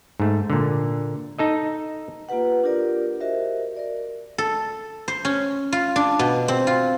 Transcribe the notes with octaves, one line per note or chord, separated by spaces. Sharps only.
G#2 A3
A#2 D3
D#4 A4 D#5
A#3 F4 G4 B4 F#5
D4 F4 G4 A#4 D5
F#4 G4 A#4 C5 D#5 E5
A#4 D5
A4
C5
C#4
F4
D4
B2
C4
F4